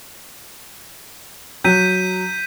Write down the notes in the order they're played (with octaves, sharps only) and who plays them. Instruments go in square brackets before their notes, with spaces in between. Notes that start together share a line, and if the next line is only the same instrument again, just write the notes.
[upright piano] F#3 [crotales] G6 B6 D#7